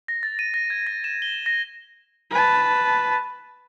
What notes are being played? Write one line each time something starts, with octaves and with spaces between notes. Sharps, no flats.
A#6
A6
D#7
A#6
G#6
A#6
E7
G7
A#6
B4 A5